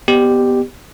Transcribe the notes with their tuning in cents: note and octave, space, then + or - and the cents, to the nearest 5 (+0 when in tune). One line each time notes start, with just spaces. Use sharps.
B3 +0 G4 +0 D5 +40